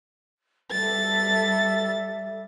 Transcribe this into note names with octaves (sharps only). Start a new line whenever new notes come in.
G3 A4 E5 A6